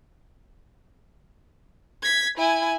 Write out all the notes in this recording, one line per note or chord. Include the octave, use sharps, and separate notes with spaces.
G#6 B6
E4 G#5